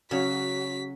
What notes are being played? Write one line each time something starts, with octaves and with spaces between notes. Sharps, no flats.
C#3 F#3 C#4 F#4 B6